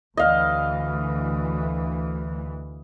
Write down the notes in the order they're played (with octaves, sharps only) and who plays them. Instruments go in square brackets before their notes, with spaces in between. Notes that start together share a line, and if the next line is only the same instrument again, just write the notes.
[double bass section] D2 E3 [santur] D#5 F5